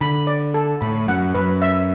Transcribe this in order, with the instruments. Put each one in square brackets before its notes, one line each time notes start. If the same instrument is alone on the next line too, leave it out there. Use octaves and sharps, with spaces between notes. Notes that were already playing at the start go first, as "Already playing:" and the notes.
[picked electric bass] D3 [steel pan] B5
[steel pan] D5
A4
[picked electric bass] A2 [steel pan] B5
[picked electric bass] F#2 [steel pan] F#5
[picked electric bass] F#2 [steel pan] B4
[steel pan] E5